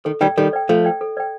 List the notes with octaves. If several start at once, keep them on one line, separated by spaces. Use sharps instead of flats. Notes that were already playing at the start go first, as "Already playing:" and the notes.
D#3 A4
D#3 G3 D5 G5
D#3 G3 A4
D5 G5
F3 A3 A4
D5 G5
A4
D5 G5